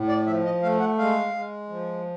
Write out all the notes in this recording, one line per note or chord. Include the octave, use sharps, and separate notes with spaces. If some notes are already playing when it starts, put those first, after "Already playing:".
Already playing: A2
D5
F3 E5
D#5
A3 F5
F#5
G#3 F5
G#3
F3